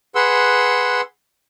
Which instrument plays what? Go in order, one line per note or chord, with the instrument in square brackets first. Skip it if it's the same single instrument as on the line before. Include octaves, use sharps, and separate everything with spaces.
[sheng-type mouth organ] G#4 B4 F#5 C6 E6